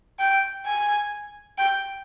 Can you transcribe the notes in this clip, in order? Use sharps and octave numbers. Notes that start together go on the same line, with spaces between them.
G5
G#5
G5